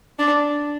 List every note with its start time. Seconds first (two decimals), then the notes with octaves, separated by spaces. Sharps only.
0.19 D4